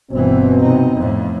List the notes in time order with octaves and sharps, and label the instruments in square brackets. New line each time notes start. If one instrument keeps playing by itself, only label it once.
[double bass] G1 E3 [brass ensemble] B2 C4
[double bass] C3 D#4
F2 A2